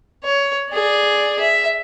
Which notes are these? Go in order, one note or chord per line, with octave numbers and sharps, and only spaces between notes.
C#5
G#4 D5
E5